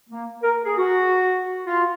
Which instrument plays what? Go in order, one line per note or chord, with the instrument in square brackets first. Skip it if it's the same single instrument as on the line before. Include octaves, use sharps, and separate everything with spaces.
[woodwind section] A#3
A#4
G#4
F#4
F4